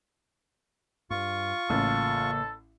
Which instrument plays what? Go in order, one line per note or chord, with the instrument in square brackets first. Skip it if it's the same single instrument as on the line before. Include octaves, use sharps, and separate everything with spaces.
[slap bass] G2 [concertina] F4 C#6
[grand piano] A1 [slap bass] C#3 A#3 [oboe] A4